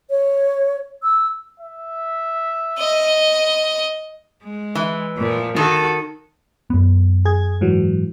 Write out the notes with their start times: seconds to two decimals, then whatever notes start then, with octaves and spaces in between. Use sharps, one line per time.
0.10 C#5
1.03 E6
1.60 E5
2.78 D#5
4.43 G#3
4.75 E3
5.17 A#2 F3
5.56 D#3 F#4 A4
6.70 F#2 B3
7.25 G#4 G#6
7.61 G#2 E3 F#3